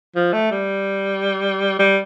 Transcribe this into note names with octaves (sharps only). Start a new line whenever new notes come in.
F3
A3
G3
G3